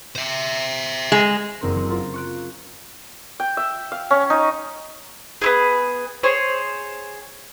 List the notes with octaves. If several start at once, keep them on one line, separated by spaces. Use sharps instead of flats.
C5 E5
G#3
F#1 C4 A#4 C5
F#3 C5 C#7
F4 A#4 C5
C#6 F#6 D7
G5
E5
F5
C#4
D#4
B3 E4 G#4
G#4 C5 C#5